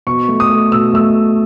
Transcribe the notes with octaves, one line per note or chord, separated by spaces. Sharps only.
B2 C#6
A3
D#6
A3
B2 E6
A3 E6